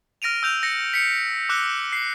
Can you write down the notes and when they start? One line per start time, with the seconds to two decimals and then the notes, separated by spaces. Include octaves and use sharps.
0.22 F6 A#6 D7 D#7 F7
0.43 E6 G6 F7
0.63 A#6 C#7
0.94 B6 C#7
1.49 D6 E6 F#6 C#7 G7
1.93 C7